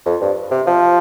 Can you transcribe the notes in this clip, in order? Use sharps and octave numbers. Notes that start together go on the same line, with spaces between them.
F2
G2
C3
F3